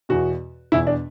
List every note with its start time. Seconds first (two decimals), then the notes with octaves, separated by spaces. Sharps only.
0.09 E2 B2 F#4
0.72 E2 B2 E4
0.87 D4